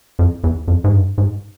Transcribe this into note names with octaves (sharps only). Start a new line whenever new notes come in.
F2
E2
F2
G#2
G2
G#2